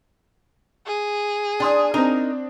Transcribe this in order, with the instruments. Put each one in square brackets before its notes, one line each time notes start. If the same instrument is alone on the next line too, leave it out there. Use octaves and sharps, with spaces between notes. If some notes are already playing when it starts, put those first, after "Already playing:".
[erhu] G#4
[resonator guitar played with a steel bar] D4 [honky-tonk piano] G#5 C6 D#6
[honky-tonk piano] C4 D4 [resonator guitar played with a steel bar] D#4 A#4